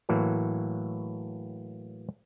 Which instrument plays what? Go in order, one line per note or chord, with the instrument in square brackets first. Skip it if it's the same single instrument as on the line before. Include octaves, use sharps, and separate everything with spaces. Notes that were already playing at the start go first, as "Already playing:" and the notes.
[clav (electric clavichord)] A2 E3 F#3 A#3